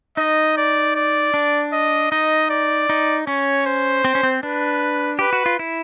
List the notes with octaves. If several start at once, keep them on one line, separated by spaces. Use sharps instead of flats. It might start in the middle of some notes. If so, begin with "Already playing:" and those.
D#4 D#5
D5
D5
D4
D#5
D#4 D#5
D5
D#4
C#4 C#5
C5
C4
C#4
C4
D4 B4
G4 B4
F#4
F4
E4